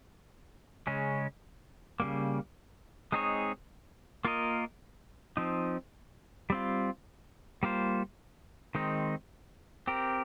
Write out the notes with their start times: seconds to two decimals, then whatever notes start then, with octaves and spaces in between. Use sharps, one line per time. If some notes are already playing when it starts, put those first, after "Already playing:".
0.87 C#3 G#3 C#4
2.00 C#3 G3 A#3
3.12 G#3 C4 D#4 G#4 C#5
4.25 A#3 F4 A#4 D#5
5.37 F3 C4 D#4
6.50 G3 C4 F4
7.63 G3 A#3 F4 C5
8.75 D#3 G#3 C4 D#4
9.87 C4 G4 A#4